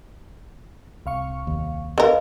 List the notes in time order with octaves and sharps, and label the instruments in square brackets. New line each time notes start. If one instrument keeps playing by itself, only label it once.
[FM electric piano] C2 F5 C#6
[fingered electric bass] D#2
[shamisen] D3 A#4 [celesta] B4 D#5 F5